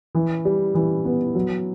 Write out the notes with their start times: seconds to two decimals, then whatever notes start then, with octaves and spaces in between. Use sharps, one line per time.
0.15 E3
0.45 G3
0.75 E3
1.05 B3
1.35 F#3